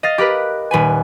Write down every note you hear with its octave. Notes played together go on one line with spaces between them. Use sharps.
D#5 F5 A6
G4 A#4 B4 F#6
D#1 B4 G#5